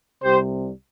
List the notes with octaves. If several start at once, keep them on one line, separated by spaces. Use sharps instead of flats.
C2 C3 G3 G4 C5